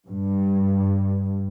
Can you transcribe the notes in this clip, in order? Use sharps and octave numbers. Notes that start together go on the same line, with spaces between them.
G2